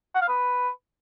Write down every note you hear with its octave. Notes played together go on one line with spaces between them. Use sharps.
F#5
F5
B4